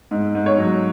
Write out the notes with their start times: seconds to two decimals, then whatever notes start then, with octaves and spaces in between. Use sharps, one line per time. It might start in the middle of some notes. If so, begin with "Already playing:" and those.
0.11 G#2
0.35 G#2
0.46 C#5
0.58 F#3